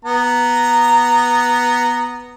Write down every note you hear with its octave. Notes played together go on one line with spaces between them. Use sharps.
B3 A#5